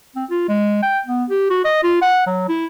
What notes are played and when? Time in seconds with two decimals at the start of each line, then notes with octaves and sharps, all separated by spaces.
0.16 C4
0.30 F4
0.48 G#3
0.83 G5
1.06 B3
1.30 G4
1.50 F#4
1.65 D#5
1.83 F4
2.02 F#5
2.26 F#3
2.49 E4